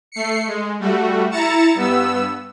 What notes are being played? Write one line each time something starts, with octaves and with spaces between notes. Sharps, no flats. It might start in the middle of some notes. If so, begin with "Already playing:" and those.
A3 C7 C#7
G#3
G3 A3 F#4
E4 A#5 A6 C#7 E7
G2 B3 E6